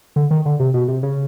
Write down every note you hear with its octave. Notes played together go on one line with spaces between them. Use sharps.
D3
D#3
D3
C3
B2
C3
C#3